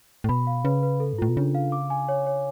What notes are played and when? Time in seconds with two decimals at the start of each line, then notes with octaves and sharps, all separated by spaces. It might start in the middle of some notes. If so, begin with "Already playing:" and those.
0.24 A2
0.29 B2 B5
0.47 F5
0.65 C#3 B4
0.83 B4
1.00 A4
1.13 G#2
1.18 A2 F4
1.29 B2
1.37 C#3 D4
1.55 F5
1.72 D6
1.90 G#5
2.09 C#5
2.27 C#5